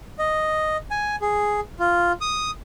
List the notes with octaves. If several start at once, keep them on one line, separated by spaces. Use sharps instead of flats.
D#5
G#5
G#4
F4
D#6